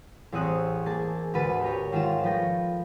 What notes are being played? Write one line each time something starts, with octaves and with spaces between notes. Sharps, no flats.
A1 E2 C4 C#6 D#6 F#6
A#3 G#4 A5
D2 G#2 B4 A5 D#7
G4 A#4 C#5
G#2 D#3 G#3 F4 E7
F3 A3 B4 G5 A#6